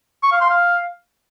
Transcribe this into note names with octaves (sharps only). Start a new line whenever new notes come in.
C#6
F5
C6
F5